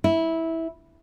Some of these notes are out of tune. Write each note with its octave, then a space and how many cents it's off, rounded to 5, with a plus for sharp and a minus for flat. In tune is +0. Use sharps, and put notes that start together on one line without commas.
E4 -15